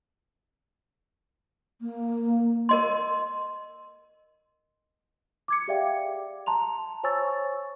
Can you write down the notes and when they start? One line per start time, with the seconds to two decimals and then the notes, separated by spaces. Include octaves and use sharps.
1.81 A#3
2.69 A#4 D#5 C6
5.48 D6 G#6 C#7
5.68 G4 G#4 D5 E5 F5 G5
6.46 A5 A#5 C6 F7
7.04 C5 C#5 G#5 C#6 E6 A6